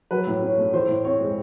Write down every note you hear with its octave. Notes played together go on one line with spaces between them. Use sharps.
F#3 B4
A2
C#4
A3
E3 C5
A2
C4 C#5
G#3